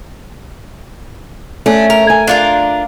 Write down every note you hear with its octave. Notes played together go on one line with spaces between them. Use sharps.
A3 C#4 D4
A#4
G#5
D4 F4 A#4